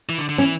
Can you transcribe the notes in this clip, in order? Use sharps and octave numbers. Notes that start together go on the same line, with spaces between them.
E3
D3
D3
E3 C#4